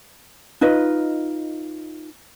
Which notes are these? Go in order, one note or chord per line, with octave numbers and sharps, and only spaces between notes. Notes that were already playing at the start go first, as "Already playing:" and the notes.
D#4 F4 B4 D#5